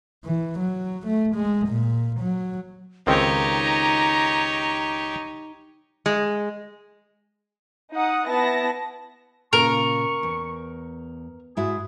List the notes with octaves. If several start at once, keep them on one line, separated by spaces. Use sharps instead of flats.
E3
F#3
A3
G#3
A#2
F#3
C#2 D#3 C4 D#4 G4 C#5 A#5
G#3
D#4 F#5 D#6
B3 E4 A5 A#6
A#2 C#3 F4 A#4 C#6
E2
G#2 E4 F#4 G#4